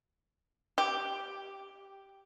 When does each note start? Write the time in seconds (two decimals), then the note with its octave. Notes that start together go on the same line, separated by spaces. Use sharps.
0.78 G4